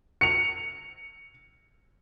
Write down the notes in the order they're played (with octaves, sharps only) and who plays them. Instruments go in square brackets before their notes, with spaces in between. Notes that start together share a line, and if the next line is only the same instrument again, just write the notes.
[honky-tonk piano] C#7 F7